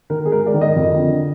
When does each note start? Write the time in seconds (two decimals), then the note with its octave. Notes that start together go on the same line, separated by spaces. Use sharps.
0.10 D#3 A#4
0.25 G#4
0.32 G#2 A#4
0.46 D5
0.54 D#3
0.61 D#5
0.76 F2
0.98 D3